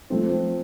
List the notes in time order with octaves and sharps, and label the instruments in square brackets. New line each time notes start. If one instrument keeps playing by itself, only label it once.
[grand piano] F3 A3 C4